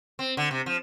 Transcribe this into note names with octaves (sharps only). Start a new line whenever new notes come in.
C4
D3
C3
F3